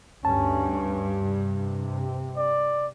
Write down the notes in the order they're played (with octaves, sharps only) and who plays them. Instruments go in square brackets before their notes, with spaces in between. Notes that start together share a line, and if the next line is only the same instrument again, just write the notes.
[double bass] D2 C#4 [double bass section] G2 [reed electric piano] A5
[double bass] C3
[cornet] D5